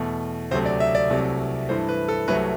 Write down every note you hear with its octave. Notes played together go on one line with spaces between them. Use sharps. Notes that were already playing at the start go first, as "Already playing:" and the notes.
Already playing: E2 B2 A3
D2 C3 F#3 A3 C5
D5
E5
D5
C2 C3 F#3 A3
G2 E3 A3 C5
B4
A4
C2 C3 F#3 A3 B4